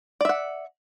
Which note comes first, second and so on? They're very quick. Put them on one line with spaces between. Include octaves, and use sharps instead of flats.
D5 E5 F#5